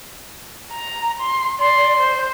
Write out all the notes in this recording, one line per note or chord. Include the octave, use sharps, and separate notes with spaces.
A#5
C6
D5 C6
C5